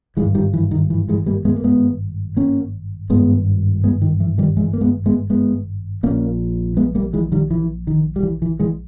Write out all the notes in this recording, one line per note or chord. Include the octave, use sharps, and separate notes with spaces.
G#1 G2 E3 G#3
D#3 G3
E3
D#3
E3
E3 G#3
G3 A#3
G#3 B3
A#3
G#3 B3
A#3 C#4
G#1 G2 G#3 B3
G#3 B3
D#3
E3
D#3 G3
E3 G#3
A#3
G#3 B3
G#3 B3
G#3 B3
A#1 A#2 A#3 C#4
G#3 B3
G3 A#3
E3 G#3
D#3 G3
E3
D#3
G3
E3
E3
E3 G#3